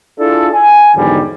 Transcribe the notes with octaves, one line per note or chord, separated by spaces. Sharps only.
D4 E4 F4 G#4 A4
G#5
E2 G#2 D3 D#3 F#3 G3